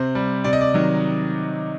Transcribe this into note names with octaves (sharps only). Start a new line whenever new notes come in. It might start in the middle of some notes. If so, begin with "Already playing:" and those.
Already playing: C3 C5
G3
C3 D5
D#5
D5
D#3 F#3